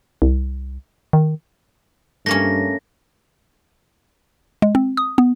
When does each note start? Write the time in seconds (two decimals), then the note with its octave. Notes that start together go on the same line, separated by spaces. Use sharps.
0.22 C2
1.13 D#3
2.26 G2 A3 A#3 C#4 A#6
4.62 G#3
4.75 C4
4.97 D#6
5.18 B3